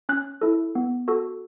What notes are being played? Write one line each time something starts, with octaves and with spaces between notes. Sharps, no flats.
C#4 F#6
E4 A4
B3
F#4 A4